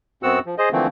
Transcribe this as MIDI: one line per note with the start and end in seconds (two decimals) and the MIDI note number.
0.23 0.39 42
0.23 0.39 59
0.23 0.39 60
0.23 0.39 66
0.23 0.39 78
0.23 0.39 88
0.46 0.55 53
0.58 0.69 68
0.58 0.69 72
0.58 0.69 75
0.72 0.87 50
0.72 0.87 52
0.72 0.87 53
0.72 0.87 57
0.72 0.87 58
0.72 0.87 60